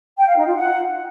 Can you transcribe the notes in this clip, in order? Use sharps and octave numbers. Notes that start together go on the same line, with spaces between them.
G5
F5
D#4
F4
F#5